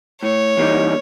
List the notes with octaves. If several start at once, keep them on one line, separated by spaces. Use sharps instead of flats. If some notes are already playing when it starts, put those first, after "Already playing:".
A2 C#5
E3 G3 A#3 D#4